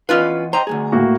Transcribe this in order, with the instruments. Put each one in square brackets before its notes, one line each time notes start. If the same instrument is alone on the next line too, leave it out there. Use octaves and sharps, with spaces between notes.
[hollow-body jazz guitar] E2 D#5 F5 [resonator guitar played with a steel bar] C#4 F4 B4
[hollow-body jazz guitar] C5 D#5 G5 [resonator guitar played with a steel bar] A#5
[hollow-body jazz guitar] D2 G2 G#4
[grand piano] A2 A#3 F#4